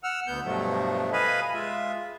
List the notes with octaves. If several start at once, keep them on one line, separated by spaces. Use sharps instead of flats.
F#5 E6 F6
D2 B3 G6
G2 B2 F3 F#3 A3
B4 D#5 F5 G#5 B5
G#3 F4 E5